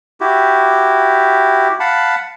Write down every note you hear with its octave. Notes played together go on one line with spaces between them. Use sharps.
E4 F#4 G4
F5 F#5 A5 B5